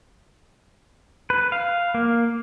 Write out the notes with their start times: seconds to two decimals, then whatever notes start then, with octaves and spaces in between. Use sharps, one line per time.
1.30 B4
1.52 F5
1.94 A#3